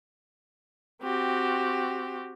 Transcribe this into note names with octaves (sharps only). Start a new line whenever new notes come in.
C4 F#4 G4